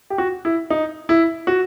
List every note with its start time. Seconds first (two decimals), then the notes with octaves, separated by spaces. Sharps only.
0.10 G4
0.18 F#4
0.45 E4
0.70 D#4
1.09 E4
1.47 F#4